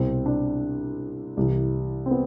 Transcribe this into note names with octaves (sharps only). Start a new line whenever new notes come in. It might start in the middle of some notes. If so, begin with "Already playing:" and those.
Already playing: C2 B2 C4
D4
C2 C3 E3
C4
B3